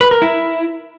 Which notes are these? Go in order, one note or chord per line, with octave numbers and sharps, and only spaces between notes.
B4
A#4
E4